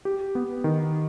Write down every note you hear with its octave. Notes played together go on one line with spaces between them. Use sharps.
G4
B3
D#3